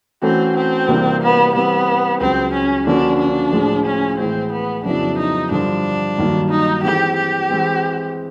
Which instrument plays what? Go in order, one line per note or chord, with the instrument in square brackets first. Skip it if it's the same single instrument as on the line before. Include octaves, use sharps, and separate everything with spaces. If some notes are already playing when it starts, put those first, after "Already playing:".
[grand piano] E3 A3 C#4 F#4 A4 [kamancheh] C4
[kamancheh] C4
[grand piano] C3 E3 G3 A#3 D4
[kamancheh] B3
[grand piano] E3 G3 C4 [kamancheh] B3
[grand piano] C#2 C#3 F#3 [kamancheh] C4
[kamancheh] C#4
[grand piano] D3 F3 A#3 C#4 F#4 [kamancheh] D4
[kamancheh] D4
[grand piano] A2 F3 G#3
[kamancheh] C#4
[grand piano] A2 E3 G#3 [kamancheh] C4
[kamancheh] B3
[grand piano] F2 C#3 F#3 B3 E4 [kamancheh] D4
[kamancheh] D#4
[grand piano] G2 D3 F3 [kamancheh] D4
[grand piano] G2 D#3 F#3 A#3
[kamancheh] D#4
[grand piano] E3 G#3 C4 E4 A4 [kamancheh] G4
[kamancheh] G4
[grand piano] E3 G#3 C4